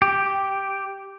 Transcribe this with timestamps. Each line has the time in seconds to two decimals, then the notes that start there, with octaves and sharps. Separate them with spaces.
0.02 G4